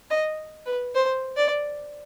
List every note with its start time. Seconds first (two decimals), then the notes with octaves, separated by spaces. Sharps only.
0.10 D#5
0.65 B4
0.95 C5
1.36 D5